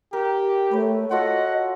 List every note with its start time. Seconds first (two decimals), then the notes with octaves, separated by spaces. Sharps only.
0.13 G4 A#4
0.71 A3 B4 C#5
1.11 F4 F#4 A4 D#5 F#5